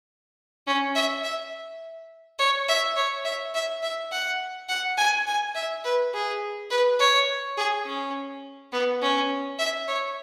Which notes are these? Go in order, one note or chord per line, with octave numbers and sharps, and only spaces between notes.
C#4
E5
E5
C#5
E5
C#5
E5
E5
E5
F#5
F#5
G#5
G#5
E5
B4
G#4
B4
C#5
G#4
C#4
B3
C#4
E5
C#5